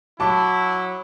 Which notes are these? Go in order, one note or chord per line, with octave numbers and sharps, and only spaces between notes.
F#3 E4 A5 D6